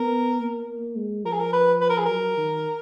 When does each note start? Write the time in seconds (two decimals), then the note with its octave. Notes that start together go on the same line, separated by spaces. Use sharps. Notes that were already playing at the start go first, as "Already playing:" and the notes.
Already playing: B3 A#4
0.40 A#3
0.96 G#3
1.25 F3 A#4
1.33 G#4
1.40 A#4
1.53 B4
1.81 B4
1.90 A#4
1.98 G#4
2.06 F#3 A#4
2.37 D#3